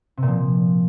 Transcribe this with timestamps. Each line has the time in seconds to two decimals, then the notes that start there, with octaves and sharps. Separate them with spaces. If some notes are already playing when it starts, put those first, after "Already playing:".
0.17 C3
0.23 A#2
0.28 F3